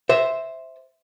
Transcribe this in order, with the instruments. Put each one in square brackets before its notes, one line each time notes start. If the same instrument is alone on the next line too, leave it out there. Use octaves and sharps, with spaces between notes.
[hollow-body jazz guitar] C5 E5